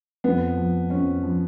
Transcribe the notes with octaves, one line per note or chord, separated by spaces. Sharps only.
F2 B3
F3
F2 C#4
F3